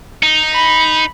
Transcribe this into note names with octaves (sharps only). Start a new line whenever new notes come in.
D#4
B5